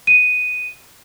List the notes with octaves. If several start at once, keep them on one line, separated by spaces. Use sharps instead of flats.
D#7